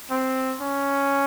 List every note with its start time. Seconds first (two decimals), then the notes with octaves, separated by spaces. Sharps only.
0.11 C4
0.61 C#4